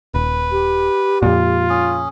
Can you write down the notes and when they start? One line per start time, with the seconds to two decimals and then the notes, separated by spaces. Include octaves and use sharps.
0.14 D#1 B4
0.52 G4
1.22 F2 A#2 F4
1.70 C#4 G#4